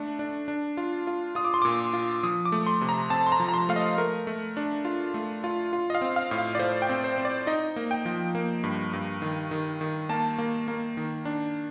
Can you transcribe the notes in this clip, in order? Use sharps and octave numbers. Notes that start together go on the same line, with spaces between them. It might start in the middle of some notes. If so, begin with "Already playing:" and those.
Already playing: A3 D4
D4
D4
F4
F4
F4 D#6
D6
C6
A#2 D6
F4
F3 D#6
D6
A3
C6
C3
A#5
C4 A5
C6
A#5
F3
A#5
C6
A3 F5
D#5
A3 A#4
A3
D4
F4
A3
F4
F4
D#5
F5
C4
F5
A2
F5
D5
A3 C5
G5
C4
C5
C4
D5
D#4 D#5
A#3
G5
F3
A#3
G2
G2
D#3
D#3
D#3
A#3 A5
A#3
A#3
D#3
D4